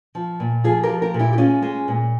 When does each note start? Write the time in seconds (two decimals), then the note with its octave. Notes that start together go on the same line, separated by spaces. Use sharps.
0.15 F3
0.40 A#2
0.64 F3 F4 G#4
0.83 G4 A#4
0.89 F3
1.02 G4 A#4
1.14 A#2
1.19 E4 G4
1.33 G4
1.38 G#3 C#4 F4
1.62 G#3
1.88 A#2